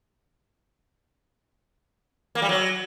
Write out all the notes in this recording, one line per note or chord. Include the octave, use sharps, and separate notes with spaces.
A#3
G3
F#3